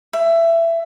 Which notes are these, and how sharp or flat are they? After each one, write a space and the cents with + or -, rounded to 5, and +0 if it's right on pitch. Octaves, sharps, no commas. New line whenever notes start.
E5 +20